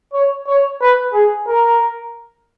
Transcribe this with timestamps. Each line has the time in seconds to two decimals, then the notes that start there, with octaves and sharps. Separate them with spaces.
0.13 C#5
0.47 C#5
0.81 B4
1.13 G#4
1.47 A#4